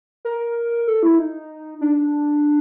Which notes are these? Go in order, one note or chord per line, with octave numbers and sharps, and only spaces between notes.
A#4
A4
E4
D#4
D4